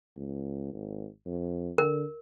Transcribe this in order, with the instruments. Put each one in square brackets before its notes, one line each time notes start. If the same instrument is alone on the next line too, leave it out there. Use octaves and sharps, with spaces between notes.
[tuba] C#2
G#1
F2
[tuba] D3 [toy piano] A#4